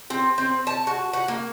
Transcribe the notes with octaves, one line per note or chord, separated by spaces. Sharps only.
C4
C4
A5
F#4
F#5
A#3